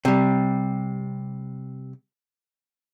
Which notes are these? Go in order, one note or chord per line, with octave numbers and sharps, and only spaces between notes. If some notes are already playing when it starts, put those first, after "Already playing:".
C3 G3